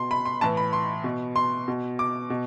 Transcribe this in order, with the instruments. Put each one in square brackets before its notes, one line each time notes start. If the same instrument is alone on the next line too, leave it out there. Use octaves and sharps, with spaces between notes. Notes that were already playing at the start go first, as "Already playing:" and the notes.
Already playing: [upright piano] B2 C6
B5
C6
A2 E3 A5
B5
C6
B2
C6
B2
D6
B2